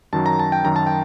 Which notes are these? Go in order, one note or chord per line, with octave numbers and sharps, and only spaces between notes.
F#2 D#3 F#3 A5
A#5
A5
G5
F#2 D#3 F#3 A#5
A5
G5